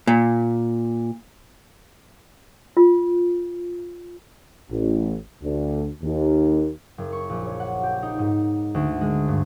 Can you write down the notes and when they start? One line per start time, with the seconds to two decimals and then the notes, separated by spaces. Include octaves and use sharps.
0.07 A#2
2.77 F4
4.71 A1
5.42 D2
6.03 D#2
6.98 F#1
7.12 C#6
7.29 A#1
7.45 C#5
7.60 F#5
7.83 G4
8.02 D#4
8.19 G#2
8.74 D2
9.01 G#3
9.28 G2